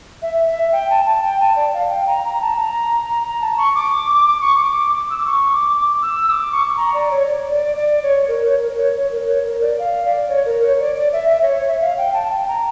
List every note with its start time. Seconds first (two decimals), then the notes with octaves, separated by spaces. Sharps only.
0.22 E5
0.48 E5
0.72 G5
0.90 A5
1.06 A5
1.23 G5
1.40 A5
1.56 D5
1.74 F5
1.90 G5
2.07 A#5
2.24 A#5
2.41 A5
2.58 A#5
3.24 A#5
3.41 A5
3.58 C#6
3.75 D6
4.25 D6
4.41 C#6
4.59 D6
5.10 E6
5.17 D6
5.26 C#6
5.51 D6
5.76 D6
6.02 E6
6.27 E6
6.30 D6
6.52 C#6
6.77 A#5
6.94 D5
7.11 C#5
7.27 D5
7.52 D5
7.77 D5
8.03 C#5
8.28 A#4
8.45 C#5
8.62 A#4
8.78 C#5
8.96 C#5
9.12 A#4
9.28 C#5
9.45 A#4
9.62 D5
9.79 F5
10.05 D5
10.29 C#5
10.45 A#4
10.62 C#5
10.80 D5
10.96 D5
11.13 E5
11.30 E5
11.42 C#5
11.55 C#5
11.68 E5
11.81 F5
11.98 G5
12.13 A5
12.31 G5
12.48 A#5